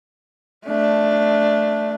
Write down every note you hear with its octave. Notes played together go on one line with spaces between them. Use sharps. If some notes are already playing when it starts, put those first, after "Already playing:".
A3 D4